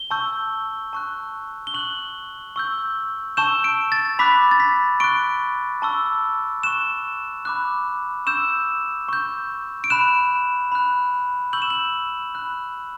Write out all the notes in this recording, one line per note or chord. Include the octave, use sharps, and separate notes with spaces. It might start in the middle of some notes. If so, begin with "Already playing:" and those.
Already playing: G7
A5 C#6 E6 G6
A5 C#6 F#6
G7
C#6 F#6 F#7
C#6 E6 G6
A5 C#6 E6 G6 E7
D7
A6
B5 D6 F#6 B6
A6
B6
C#6 F#6 D7
A5 C#6 E6
C#6 F#6 E7
B5 D6 F#6
C#6 E6 G6 E7
C#6 G6
D7
B5 F#6 E7
B5 F#6
C#6 E6 G6 F#7
E7
F#7
B5 F#6